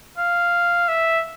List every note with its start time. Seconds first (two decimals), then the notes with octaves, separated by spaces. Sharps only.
0.18 F5
0.88 E5